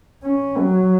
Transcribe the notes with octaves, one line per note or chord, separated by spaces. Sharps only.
C#4
F#3